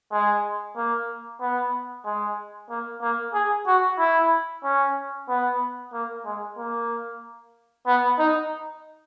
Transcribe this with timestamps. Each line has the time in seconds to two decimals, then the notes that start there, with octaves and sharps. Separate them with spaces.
0.12 G#3
0.77 A#3
1.41 B3
2.05 G#3
2.70 A#3
3.02 A#3
3.34 G#4
3.67 F#4
3.99 E4
4.64 C#4
5.29 B3
5.93 A#3
6.25 G#3
6.58 A#3
7.87 B3
8.19 D#4